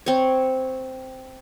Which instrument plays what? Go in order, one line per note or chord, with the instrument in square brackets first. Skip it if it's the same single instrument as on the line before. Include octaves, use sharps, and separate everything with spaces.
[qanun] C4 C#5